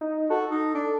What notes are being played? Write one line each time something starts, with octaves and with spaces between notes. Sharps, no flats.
D#4
F#4 A4
D#4
D4